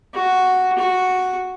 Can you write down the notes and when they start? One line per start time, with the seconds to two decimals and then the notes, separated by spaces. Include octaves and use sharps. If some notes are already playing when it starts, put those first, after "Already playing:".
0.14 F#4
0.78 F#4